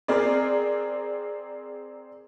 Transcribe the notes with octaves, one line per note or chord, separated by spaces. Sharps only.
C4 G#4 A#4 D5